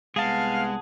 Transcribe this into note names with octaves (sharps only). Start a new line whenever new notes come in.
C2 G#3 B3 G#4 F5 F#5 A5